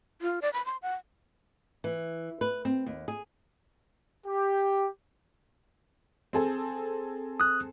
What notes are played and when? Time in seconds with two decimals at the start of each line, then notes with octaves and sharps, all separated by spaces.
0.22 F4
0.42 D5
0.53 B5
0.66 C6
0.82 F#5
1.84 E3
2.41 B4
2.65 C4
2.86 D#2
3.08 G#4
4.26 G4
6.33 C4 G#4 A4
7.40 D#6 F#6